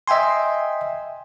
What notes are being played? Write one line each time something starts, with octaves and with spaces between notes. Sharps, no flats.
D#5 E5 G5 G#5 C6